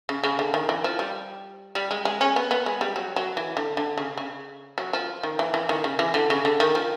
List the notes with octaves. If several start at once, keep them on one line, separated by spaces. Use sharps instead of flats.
C#3
C#3
D3
D#3
E3
F3
G3
G3
G#3
G#3
C#4
B3
B3
G#3
G3
F#3
F#3
E3
D3
D3
C#3
C#3
F#3
F3
D#3
E3
E3
D#3
C#3
E3
D3
C#3
D3
D#3
F3